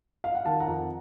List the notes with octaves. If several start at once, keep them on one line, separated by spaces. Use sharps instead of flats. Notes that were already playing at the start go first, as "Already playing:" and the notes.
F5
F#5
D#3 F5 A5
F#5 A#5
F2